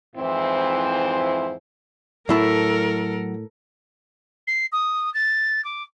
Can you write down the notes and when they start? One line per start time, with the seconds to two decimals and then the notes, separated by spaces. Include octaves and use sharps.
0.16 F2 G#2 E3 C4 E4 C5
2.29 A2 F#3 E4 A4 A#4 A5
4.47 C7
4.72 D#6
5.14 A6
5.65 D6